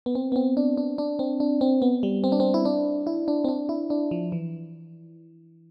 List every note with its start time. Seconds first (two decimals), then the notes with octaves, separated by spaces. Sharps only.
0.06 B3
0.15 C4
0.32 B3
0.36 C4
0.57 D4
0.77 D4
0.98 D4
1.19 C4
1.40 D4
1.61 C4
1.82 B3
2.03 G3
2.24 C4
2.32 D4
2.40 C4
2.54 E4
2.65 D4
3.07 E4
3.28 D4
3.44 C4
3.48 D4
3.69 E4
3.90 D4
4.11 F3
4.32 E3